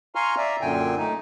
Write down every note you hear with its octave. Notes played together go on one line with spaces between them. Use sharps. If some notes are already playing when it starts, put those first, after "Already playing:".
F5 G#5 A#5 C6 C#6 F6
D5 E5 A#5
F#2 A#2 D3 G5 G#5
A3 D#4